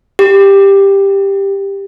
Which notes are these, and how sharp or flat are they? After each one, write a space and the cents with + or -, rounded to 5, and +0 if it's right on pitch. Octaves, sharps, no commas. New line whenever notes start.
G4 +10